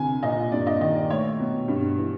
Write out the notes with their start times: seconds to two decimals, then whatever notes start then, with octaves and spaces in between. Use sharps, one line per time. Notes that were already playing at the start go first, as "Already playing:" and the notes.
Already playing: C2 D3 G#5
0.23 A#2 D#5
0.52 G2 D5
0.67 D#5
0.81 D#3 D#5
0.96 D5
1.10 A3 C#5
1.39 B2
1.68 G2
1.98 E3